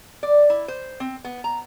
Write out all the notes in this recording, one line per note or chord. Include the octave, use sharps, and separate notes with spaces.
D5
E4
C5
C4
B3
A#5